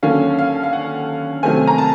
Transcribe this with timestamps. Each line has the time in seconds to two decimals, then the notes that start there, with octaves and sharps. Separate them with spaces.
0.03 D#2 D3 F#3 A#3 C#4 F5
0.39 F5
0.63 F5
0.73 F#5
1.43 C3 D#3 F#3 A3 C4 G#5
1.67 A#5
1.78 A5